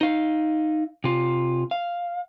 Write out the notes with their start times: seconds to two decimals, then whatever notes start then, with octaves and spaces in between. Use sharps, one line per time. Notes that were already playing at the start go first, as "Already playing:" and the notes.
0.01 D#4 F5
1.04 C3 F4
1.71 F5